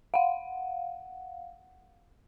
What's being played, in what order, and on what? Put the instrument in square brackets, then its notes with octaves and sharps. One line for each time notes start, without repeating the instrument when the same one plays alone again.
[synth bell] F5 F#5